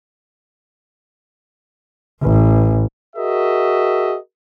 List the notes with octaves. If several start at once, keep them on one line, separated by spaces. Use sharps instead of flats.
A1
F#4 G#4 A#4 D#5 E5